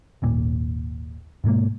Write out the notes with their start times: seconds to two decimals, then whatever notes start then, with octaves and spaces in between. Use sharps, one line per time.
0.22 G#1 D#2 A#2
1.44 G#2 B2 G#3 A#3